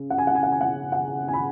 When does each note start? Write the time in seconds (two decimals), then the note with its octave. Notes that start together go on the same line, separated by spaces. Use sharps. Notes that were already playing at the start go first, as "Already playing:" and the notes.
Already playing: C#3
0.10 F#5
0.18 G#5
0.27 F#5
0.35 G#5
0.43 F#5
0.52 G#5
0.61 F#5
0.92 F#5
1.28 G#5
1.33 B5